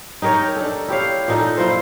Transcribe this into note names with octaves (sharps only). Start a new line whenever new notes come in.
D#4 G4 A#4 C#5
D4 A4
E4 G4 C#5 F5
A#2 D#4 A4
E4 F4 A#4 C5